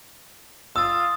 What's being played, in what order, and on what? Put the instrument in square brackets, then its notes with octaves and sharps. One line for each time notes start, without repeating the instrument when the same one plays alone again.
[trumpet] F4 [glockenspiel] D#6 A6 [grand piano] E6